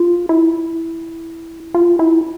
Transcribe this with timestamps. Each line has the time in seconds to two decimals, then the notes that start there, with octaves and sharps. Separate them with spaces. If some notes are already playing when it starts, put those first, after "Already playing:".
Already playing: F4
0.29 E4
1.74 F4
1.99 E4